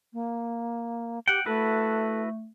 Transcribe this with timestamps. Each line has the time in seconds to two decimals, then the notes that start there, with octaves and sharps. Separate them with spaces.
0.13 A#3
1.28 G4 F#5 G5
1.46 A3 E4 F#4 A4 B4